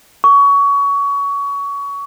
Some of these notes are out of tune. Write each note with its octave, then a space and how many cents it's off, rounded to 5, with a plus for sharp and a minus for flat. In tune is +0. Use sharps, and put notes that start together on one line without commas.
C#6 +25